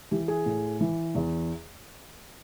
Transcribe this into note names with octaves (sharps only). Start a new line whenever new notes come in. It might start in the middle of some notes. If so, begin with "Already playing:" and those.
E3 G4
G#4
A2
E3
E2